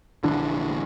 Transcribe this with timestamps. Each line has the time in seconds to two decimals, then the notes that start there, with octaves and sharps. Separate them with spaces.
0.23 A#1 D3 E3 D4